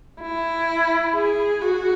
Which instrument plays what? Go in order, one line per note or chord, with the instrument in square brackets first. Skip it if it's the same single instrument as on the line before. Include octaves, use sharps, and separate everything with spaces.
[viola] E4
G#4
F#4